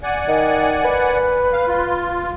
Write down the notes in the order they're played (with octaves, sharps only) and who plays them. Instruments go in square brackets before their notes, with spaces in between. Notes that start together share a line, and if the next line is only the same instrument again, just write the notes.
[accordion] D5 F#5 G#5
[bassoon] D#3
B4
[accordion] F5
F4